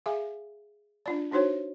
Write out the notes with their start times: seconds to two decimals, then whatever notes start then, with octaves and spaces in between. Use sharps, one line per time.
0.06 G#4 E5 F5 G#5
1.06 D4 F4 D5
1.31 D4 D#4 F#4 C5 C#5